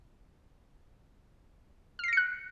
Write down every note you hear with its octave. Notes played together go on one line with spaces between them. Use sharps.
F6 F#6 A#6 C7 C#7